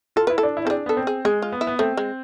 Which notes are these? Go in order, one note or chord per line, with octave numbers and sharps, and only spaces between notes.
F4 A4
E4 B4
A4
D4
E4
C4 A4
D4 G#4
B3 A4
C4
G#4
G#3 G#4
F4
B3
E4
B3
A3 C4
G#3